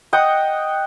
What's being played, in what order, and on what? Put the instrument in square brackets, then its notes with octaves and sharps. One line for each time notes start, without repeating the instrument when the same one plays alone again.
[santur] D#5 F#5 G5 D#6